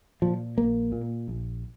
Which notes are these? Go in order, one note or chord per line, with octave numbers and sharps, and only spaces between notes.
A#2 F3
A#1 A#3
A#2
A#1